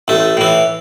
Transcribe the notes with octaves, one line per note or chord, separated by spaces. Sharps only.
A1 A3
A2 E3